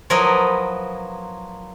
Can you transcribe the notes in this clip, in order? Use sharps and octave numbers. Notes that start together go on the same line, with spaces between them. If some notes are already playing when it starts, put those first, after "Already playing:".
F3 F#3 E4 A#4 B4 D#5